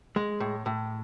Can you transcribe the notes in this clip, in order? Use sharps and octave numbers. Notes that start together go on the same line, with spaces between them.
G#3
A2
A2